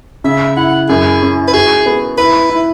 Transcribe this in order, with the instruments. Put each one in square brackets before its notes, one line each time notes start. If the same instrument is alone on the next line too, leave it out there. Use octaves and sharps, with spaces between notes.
[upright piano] C#3 [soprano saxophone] E5
[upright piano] E4 [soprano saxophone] F#5
[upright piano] F#2 [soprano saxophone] G#4
[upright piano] C#4
[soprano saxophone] B4
[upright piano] F#4 [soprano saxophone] G#4
[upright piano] B3
[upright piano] E4 [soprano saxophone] B4
[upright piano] E4